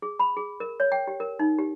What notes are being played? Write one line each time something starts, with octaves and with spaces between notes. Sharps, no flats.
G#4
B5
G#4
A#4
C#5
G5
G4
A#4
D#4
G4